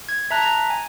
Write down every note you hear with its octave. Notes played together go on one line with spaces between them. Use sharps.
G#6
E5 A5 A#5 F#6
A#5
G#5